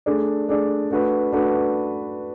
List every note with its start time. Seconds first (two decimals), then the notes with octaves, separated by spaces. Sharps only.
0.06 A3 D4 G#4 D5
0.48 A3 D4 G#4 D5
0.91 A3 D4 F#4 B4
1.32 A3 D4 F#4 B4